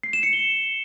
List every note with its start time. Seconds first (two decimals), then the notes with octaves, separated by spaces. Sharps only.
0.03 C7
0.13 E7
0.23 C#7
0.33 G7